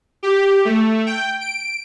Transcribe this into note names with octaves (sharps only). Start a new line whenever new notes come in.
G4
A3
G5
D7